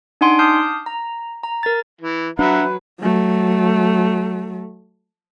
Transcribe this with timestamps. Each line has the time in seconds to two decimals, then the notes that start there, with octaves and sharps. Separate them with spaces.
0.21 D4 D#4 F#5 G#5 C6 D7
0.39 A5 D6 D#6 F6 G6 C7
0.86 A#5
1.43 A#5
1.63 A#4 A6
2.01 E3
2.39 F#3 D4 B4 E5 F#5 A#5
3.00 F#3 A3